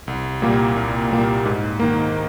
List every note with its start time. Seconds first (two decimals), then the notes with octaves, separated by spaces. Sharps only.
0.07 C2
0.42 A#2 G3 A#3
0.76 C2
1.11 A#2 G3 A#3
1.45 G#2
1.80 D#3 A#3